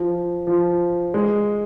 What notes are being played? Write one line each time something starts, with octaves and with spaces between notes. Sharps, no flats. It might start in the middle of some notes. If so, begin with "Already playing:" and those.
Already playing: F3
F3
G#3